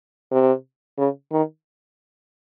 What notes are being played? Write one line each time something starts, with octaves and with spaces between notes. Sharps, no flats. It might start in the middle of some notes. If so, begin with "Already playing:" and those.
C3
C#3
D#3